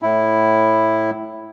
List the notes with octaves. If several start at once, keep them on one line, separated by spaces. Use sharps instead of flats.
A2 E4